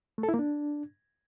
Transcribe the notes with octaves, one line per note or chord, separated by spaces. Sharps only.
A3
A4
E4
A#3
D4